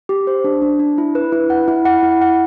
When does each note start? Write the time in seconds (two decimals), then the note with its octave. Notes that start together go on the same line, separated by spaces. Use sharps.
0.09 G4
0.27 C5
0.44 D4
0.62 D4
0.79 D4
0.98 E4
1.15 B4
1.32 E4
1.50 F#5
1.68 E4
1.85 F#5
2.03 E4
2.21 F#5